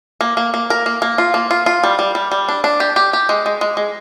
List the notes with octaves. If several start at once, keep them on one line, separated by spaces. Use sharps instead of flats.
A#3
A#3
A#3
A#4
A#3
A#3
F4
A#3
F4
F4
G3
G3
G3
G3
D4
D4
G4
G4
G4
G#3
G#3
G#3
G#3